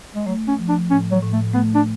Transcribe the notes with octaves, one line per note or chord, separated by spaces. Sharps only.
G#3
F#3 A3
C#4
F3
D4
A2 C#4
F#3
A2
A3
A3 B3
D4